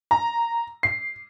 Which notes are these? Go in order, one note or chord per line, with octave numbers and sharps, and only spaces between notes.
A#5
C7